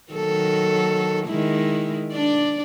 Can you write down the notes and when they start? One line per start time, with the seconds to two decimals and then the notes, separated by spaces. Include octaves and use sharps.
0.12 D#3 F#3 A4
1.27 D#3 G#3 E4
2.13 D4 D5